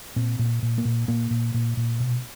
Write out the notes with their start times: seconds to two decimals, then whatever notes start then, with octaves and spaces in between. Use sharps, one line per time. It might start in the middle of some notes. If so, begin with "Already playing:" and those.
0.16 A#2 C4
0.39 A#2
0.62 A#2
0.78 A#3
0.85 A#2
1.08 A#2 A#3
1.31 A#2
1.54 A#2
1.77 A#2
2.00 B2